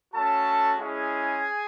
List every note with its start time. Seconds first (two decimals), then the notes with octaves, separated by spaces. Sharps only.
0.12 A3 C#4 F#4 A4 A5
0.78 G#3 C#4 E4 G#4 G#5